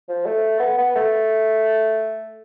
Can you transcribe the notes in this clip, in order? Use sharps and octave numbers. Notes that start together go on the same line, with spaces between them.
F3
A3
B3
B3
A3